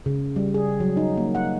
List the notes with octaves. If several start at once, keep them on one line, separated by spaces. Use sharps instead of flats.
C#3
G3
G#4
F#3
D#4
A#3
F#5